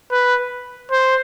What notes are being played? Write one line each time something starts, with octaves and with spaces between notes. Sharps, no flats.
B4
C5